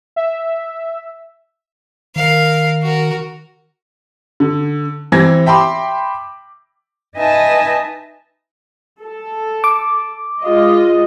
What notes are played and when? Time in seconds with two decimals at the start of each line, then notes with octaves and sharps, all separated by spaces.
0.16 E5
2.16 D#3 A#4 F5
2.83 F#4 A#4
4.40 D3
5.12 E3 C4 G4 G#6 A#6
5.46 E5 G5 B5 C6 D6
7.16 D#4 B4 D#5 E5 G#5 A5
9.01 A4
9.64 D6
10.42 G#3 F4 D#5